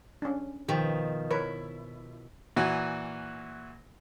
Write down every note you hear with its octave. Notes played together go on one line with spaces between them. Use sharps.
C#4 D4
B2 D#3 F3 G4
E4 A#4 B4 C#5
A#2 E3 F#4